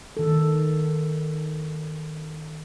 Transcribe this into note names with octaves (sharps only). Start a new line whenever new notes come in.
D#3 A4